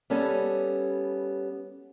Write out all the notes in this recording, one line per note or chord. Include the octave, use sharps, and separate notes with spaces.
G3 B3 C#4 A4